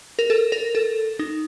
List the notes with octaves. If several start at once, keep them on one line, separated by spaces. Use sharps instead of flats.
A#4
A4
A#4
A4
D#4